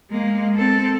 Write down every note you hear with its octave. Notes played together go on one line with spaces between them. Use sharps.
G#3 A#3
C4 A4